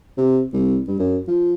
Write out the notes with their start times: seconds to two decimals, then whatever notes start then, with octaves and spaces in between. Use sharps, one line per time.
0.17 C3
0.53 C2
0.88 G2
0.99 F#2
1.28 F3